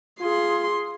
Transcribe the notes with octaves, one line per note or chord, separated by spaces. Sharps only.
F4 G#4 C6